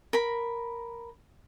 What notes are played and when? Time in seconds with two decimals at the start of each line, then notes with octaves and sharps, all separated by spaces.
0.13 A#4 B5